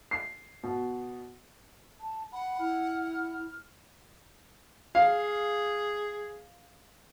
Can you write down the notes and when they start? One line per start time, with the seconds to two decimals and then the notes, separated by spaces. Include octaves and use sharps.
0.11 C7
0.63 B2
2.00 A5
2.32 F#5 B5
2.59 E4 F6
4.95 G#4 F5